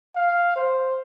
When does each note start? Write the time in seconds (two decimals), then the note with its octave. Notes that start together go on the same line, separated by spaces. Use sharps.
0.16 F5
0.56 C5